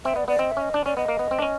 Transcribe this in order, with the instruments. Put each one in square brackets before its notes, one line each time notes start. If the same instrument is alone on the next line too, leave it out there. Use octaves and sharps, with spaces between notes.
[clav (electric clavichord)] C4 [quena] E5
[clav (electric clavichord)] B3 [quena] D5
[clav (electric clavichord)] B3 [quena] D5
[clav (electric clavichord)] C4 [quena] D#5
[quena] E5
[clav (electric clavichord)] C#4 [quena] D#5
[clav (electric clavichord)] D4 [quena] D5
[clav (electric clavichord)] C#4 [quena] D5
[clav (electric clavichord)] B3 [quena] D#5
[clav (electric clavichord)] A#3
B3
C4
D4
C#4